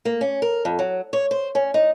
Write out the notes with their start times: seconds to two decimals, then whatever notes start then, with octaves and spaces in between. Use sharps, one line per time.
0.05 A#3
0.21 C#4
0.42 A#4
0.65 F2
0.79 F#3
1.13 C#5
1.31 C5
1.55 C#4
1.74 D#4